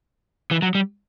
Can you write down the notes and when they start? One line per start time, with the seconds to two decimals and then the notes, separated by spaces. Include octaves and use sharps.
0.51 E3
0.62 F#3
0.75 G3